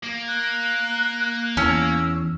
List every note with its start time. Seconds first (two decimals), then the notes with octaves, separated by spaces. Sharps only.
0.03 A#3
0.28 F#6
1.57 E2 C#4 E6